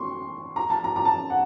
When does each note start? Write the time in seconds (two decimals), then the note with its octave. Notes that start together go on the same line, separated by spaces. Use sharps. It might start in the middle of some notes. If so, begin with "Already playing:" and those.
Already playing: C6 C#6
0.56 A#5
0.70 A5
0.84 A#5
0.96 A#5
1.05 A5
1.30 F#5